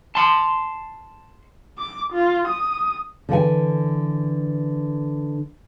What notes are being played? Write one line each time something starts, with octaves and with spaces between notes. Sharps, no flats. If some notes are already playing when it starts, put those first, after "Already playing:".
A5 C6
D6
F4
D#6
D3 E3 F#5 G#5